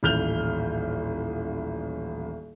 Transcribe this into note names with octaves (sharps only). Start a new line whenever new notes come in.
D#1 A1 F6 G6 F7 G7